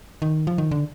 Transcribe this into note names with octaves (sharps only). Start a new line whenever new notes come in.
D#3
F3
D#3
D3